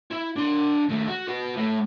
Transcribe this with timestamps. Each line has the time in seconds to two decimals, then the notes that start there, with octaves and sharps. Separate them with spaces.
0.11 E4
0.36 D4 C6
0.89 D#2 A3
1.08 F#4
1.28 F#4 B4
1.57 A2 A3